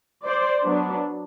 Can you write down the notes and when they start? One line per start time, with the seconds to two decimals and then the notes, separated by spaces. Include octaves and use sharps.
0.25 C5 D5
0.64 F#3 B3 D4